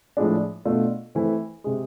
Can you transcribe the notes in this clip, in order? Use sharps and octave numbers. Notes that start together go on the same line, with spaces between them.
A2 F3 G#3 D4
B2 A3 D4 F4
E3 A3 C4 E4
C3 G#3